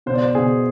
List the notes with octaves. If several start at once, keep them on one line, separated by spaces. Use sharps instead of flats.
B2 C5
D5
C5
B2 G#4